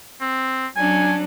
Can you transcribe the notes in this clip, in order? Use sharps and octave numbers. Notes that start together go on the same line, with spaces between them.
C4
F#3 C#4 D4 G#5